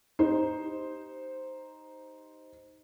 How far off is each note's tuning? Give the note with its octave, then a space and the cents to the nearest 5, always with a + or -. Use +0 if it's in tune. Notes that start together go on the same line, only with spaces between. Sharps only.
D#4 +0 G4 +0 C5 +0